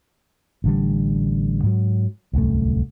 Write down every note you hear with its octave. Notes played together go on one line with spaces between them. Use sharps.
A1 D3 G3
G#2 F#3
D1 C2 F#2 A3